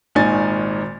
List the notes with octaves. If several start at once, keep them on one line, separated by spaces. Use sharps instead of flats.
G#1 A#2 D#3 D#4 G#5 A6